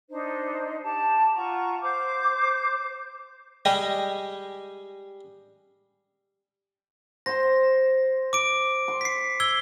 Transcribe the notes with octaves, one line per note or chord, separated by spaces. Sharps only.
D4 D#4 C5
G4 A5
F4 F#5 A#5 C#6
C5 D6 G6
G3 G#3 G4 D#5
C5 C6 A#6
D6 D7
C6
B6 C7
E6 G#6 G7